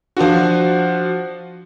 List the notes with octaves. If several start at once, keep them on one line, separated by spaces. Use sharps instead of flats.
F3 D4 F4 F#4